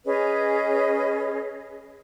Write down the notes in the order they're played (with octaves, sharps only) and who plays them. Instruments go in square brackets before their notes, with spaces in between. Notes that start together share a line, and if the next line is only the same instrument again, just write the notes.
[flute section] C#4 G#4 B4 D#5